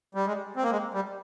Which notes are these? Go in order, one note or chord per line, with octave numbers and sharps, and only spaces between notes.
G3
G#3
C4
A#3
G#3
G3